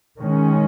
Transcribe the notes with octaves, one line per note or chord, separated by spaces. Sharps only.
D#3 G#3 C#4